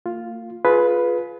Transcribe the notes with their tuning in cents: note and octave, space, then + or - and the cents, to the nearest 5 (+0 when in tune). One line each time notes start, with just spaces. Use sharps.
A#3 -40 F4 +0
F4 +10 G#4 +30 B4 +0